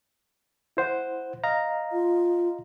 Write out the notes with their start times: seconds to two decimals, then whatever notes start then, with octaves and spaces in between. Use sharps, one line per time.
0.77 E4 C5 F#5
1.44 D#5 F5 A#5
1.92 F4